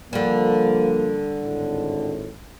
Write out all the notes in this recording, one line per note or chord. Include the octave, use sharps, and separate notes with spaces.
D3 F3 G3 A#3
G#1 A2